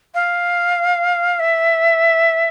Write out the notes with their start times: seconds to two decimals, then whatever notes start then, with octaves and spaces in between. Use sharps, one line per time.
0.14 F5
1.39 E5